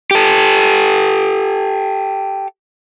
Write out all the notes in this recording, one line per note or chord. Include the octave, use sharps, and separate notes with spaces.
G4 A4